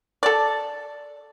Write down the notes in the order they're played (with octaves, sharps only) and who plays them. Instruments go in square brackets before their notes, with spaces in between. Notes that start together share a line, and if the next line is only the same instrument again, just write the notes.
[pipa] A4 D5